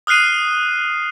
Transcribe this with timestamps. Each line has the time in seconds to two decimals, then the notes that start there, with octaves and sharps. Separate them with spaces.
0.07 D#6 F6 F#6 C7 D#7